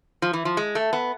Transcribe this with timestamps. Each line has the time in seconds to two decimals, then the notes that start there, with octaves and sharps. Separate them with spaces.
0.22 F3
0.33 E3
0.45 F3
0.57 G#3
0.75 A3
0.93 B3